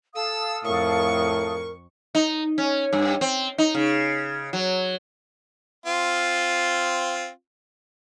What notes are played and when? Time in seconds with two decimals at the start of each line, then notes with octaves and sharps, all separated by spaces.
0.14 A4 F5 D#6 E6
0.65 F2 A2 A#4 C#6
2.15 D#4
2.58 C#4
2.93 G2
3.21 C4
3.58 D#4
3.75 C#3
4.53 F#3
5.86 C4 F4